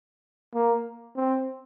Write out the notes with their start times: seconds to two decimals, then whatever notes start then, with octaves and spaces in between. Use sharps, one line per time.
0.54 A#3
1.16 C4